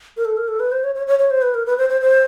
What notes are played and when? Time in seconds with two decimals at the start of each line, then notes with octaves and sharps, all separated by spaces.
0.17 A#4
0.25 A4
0.37 A#4
0.48 A4
0.60 B4
0.72 C5
0.84 C#5
0.95 C#5
1.07 C#5
1.19 C#5
1.31 C5
1.42 B4
1.54 A#4
1.66 B4
1.78 C5
1.90 C5
2.01 C5